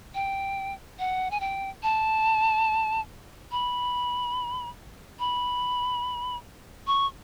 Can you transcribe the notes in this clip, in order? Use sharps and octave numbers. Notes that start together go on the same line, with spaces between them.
G5
F#5
G#5
G5
A5
B5
B5
C#6